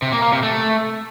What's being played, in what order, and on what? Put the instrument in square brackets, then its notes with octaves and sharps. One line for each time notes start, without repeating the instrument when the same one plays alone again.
[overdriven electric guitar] C3
A#3
A#3
C3
A3